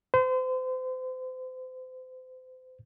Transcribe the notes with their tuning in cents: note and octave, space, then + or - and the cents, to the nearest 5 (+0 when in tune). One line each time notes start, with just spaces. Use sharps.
C5 -35